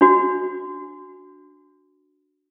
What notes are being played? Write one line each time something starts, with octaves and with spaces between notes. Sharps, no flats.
D4 F#4